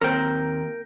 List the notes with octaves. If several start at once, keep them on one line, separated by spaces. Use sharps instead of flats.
D#2 C4 A#4 C#5 G5